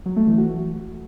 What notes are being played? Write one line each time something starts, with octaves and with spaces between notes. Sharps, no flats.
F#3
A3
E3
F#4